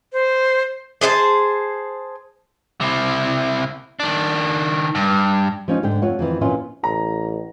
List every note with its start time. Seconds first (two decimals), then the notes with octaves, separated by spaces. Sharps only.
0.13 C5
1.01 G#4 C5 D#5 A5
2.81 C3 E4
4.00 D#3 D4
4.95 G2
5.68 F3 C#4 D#4
5.83 G#2 D3 G5
6.02 F2 F4 C#5 F#5
6.19 F2 D#3 E3
6.41 F2 A#2 E3 C#4 F4
6.84 A1 A#5